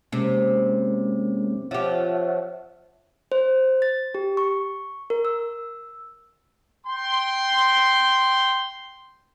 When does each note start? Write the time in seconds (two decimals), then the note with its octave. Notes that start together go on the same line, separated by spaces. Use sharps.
0.12 C3 G#3 A#3 C#4
1.71 F3 G4 C#5 E5 F#5
3.32 C5
3.82 A6
4.15 G4
4.37 C#6
5.10 A#4
5.25 E6
6.87 G5 C6